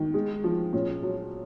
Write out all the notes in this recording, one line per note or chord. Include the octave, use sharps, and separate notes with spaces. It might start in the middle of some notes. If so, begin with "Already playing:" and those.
Already playing: D#3
G#3
F3
A#2 C#4
F#3